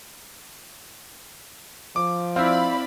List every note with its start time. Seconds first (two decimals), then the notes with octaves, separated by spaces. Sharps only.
1.96 F3 D6
2.36 C4 E4 D5 F5 B5